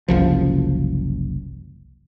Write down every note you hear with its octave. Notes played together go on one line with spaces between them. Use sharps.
F#1 C2 F3